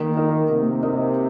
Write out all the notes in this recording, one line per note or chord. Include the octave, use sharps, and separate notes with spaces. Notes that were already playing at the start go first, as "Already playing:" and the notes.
Already playing: D#3 A#3
D#4 A#4 D#5
C3 A#3
D#4 A#4 D#5